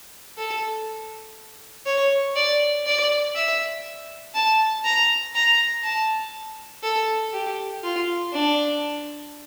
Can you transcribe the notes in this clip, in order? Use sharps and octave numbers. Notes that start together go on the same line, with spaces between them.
A4
C#5
D5
D5
E5
A5
A#5
A#5
A5
A4
G4
F4
D4